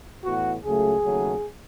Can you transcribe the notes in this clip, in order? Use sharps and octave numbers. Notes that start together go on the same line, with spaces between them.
A2 E3 B3 F#4
C#2 C#3 F#3 A3 G#4
D#2 C#3 F#3 A3